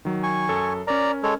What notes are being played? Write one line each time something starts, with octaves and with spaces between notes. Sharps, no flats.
D#3 F#3
G#5 C#6
F#2 A4
C#4 A#4 D5 A#5
G#3 A4 C#5